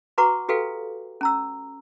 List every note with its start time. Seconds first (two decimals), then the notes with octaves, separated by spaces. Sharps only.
0.18 F#4 B4 F#5 A#5 C#6 D6
0.49 F#4 G4 A4 B4 F5 G5
1.21 C#4 A#5 E6